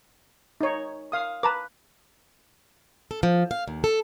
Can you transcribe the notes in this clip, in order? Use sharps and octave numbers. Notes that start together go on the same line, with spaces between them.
D#4 C#5
F5 D#6
B4 A5 A#5 D6
A4
F3
F5
D#2
A4